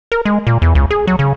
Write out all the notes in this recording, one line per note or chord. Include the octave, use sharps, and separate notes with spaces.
A#4
G#3
A#2
E2
C#2
G#4
F#3
C#3